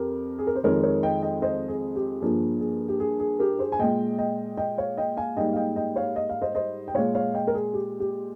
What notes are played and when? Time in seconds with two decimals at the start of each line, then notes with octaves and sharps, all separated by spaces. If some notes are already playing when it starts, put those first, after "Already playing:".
Already playing: F2 G4 A#4
0.38 G#4
0.47 A#4
0.55 C5
0.63 F2 D#3 G#3 A#4 C#5
0.83 A#4 C#5
1.03 D#5 G5
1.23 D#5 G5
1.42 C5 D#5
1.68 G#4
1.96 G4
2.21 G2 F3 A#3 G#4
2.60 G#4
2.88 G4
3.00 G#4
3.20 G#4
3.39 G4 A#4
3.59 G#4 C5
3.72 G#5
3.79 A#2 G#3 D#5 G5
4.18 D#5 G5
4.57 D#5 G5
4.78 C#5 F5
4.97 D#5 G5
5.17 F5 G#5
5.37 G#2 G3 A#3 D#5 G5
5.53 F5
5.56 D#5 G5
5.76 D#5 G5
5.96 C#5 F5
6.16 D#5
6.29 F5
6.42 C5 D#5
6.55 C5 D#5
6.88 G5
6.94 A#2 G#3 C#5 F5
7.15 C#5 F5
7.34 D#5 G5
7.47 A#4
7.54 G#4
7.74 G4
8.00 G4